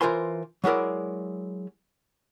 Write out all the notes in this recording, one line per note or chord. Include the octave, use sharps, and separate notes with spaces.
E3 F4 A#4 C5 G#5 C6
F#3 G#3 E4 A#4 D5